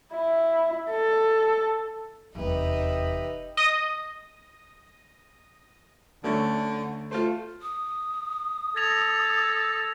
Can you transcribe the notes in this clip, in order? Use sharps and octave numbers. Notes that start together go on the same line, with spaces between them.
E4
A4
F1 E2 D#4 G4 B4 D#5 E5
D#5 D#6
D2 D3 A3 C#4
A3 F4 C5
D#6
A4 G#6 A#6 F7